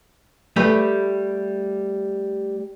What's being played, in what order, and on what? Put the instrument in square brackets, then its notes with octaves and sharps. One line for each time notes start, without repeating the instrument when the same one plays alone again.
[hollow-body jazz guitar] G3 A3 G4 B4